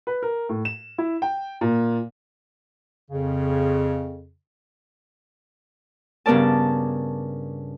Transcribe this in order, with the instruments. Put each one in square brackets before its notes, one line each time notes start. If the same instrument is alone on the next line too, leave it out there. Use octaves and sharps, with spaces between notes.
[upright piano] B4
A#4
A2
E7
E4
G5
A#2
[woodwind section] F2 C#3
[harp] G2 C#3 B3 A#4 D5 A5